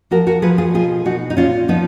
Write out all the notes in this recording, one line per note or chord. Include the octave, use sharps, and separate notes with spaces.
F3 F#4 A#4
F#4 A#4
F3 G#4 B4
F4 G#4
B2 F4 G#4
B2 D#4 F#4
D#4
A#2 C#4 F4
F3 B3 D#4